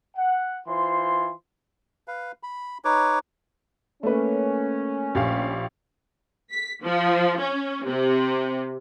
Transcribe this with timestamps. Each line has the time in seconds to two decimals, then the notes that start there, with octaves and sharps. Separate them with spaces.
0.17 F#5
0.68 E3 F4 C5 C6
2.08 B4 F5
2.43 B5
2.85 D#4 B4 C#5 D6
4.03 A3 A#3 C#4 B4
5.15 A#1 G4 F5
6.51 B6
6.83 F3
7.39 C#4
7.86 C3